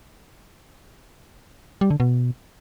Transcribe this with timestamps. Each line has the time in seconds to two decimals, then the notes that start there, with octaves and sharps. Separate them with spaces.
1.81 G3
1.90 D3
2.00 B2